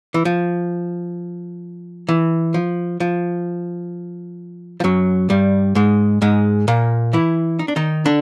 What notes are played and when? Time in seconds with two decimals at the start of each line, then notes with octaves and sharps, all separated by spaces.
0.14 E3
0.25 F3
2.08 E3
2.54 F3
3.00 F3
4.80 F3
4.84 F#2 F#3
5.30 G2 G3
5.75 G#2 G#3
6.22 G#2 G#3
6.68 A#2 A#3
7.13 E3 E4
7.59 D#4
7.68 D4
7.76 D#3 D#4
8.06 D3 D4